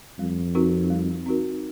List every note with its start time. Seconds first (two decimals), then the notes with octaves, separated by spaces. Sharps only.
0.19 F2 G3
0.55 C4 D#4 F#4 A#4
0.90 G3
1.26 C4 D#4 F#4 A#4